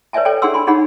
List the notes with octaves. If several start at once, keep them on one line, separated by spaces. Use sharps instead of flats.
B4 C#5 D5 E5 G#5 A5
A4 C#5 D5 G5 G#5
D4 G#4 F#5 G#5 C6 E6
G#5 B5 C6
D4 D#4 G#4 C#5 F#5 B5